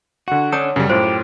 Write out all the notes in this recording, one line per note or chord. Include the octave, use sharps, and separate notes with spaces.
D3 F#4 F#5
C#4 D4 A4 C#5 D#6
F#2 C#3 G3
F#2 A2 F4 G4 C5